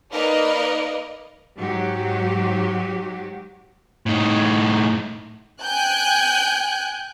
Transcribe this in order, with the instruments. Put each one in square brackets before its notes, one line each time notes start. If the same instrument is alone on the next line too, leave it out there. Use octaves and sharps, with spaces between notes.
[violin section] A#3 D#4 A#4 B4 D5 D#5
[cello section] G#2 F#3 F#4 G4
[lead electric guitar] A2 D#4
[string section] G5 G#5 F#6 G6